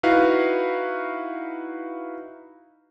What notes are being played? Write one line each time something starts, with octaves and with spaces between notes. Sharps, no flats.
D#4 E4 F#4 B4 F5